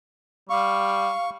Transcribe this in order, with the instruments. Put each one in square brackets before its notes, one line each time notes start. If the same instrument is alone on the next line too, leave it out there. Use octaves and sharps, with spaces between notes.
[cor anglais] G3 [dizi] F5 [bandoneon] C#6